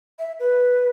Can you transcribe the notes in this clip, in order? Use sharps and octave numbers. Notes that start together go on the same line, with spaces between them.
E5
B4